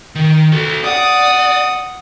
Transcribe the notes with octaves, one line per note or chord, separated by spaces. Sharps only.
D#3
F#4 A4
D5 F#5 D#6